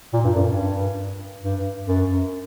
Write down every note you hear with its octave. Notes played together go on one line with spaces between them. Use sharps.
A#2
G2
F#2
G2
G2
F#2